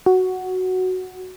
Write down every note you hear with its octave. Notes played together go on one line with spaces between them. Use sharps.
F#4